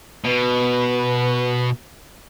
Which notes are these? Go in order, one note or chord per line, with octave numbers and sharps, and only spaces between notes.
B2 B4